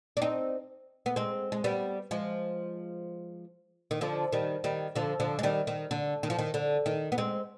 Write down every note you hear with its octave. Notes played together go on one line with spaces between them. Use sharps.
D4
C4 D#4
B3
G#3 C4
G#3
G3 B3
F3 G#3
D#3
D3 F3
D#3 G3
D#3 G3
D3 F3
D3 F3
G#3
D#3 G3
D#3
D3
D#3
F3
D#3
D3
D#3
B3
G#3 C4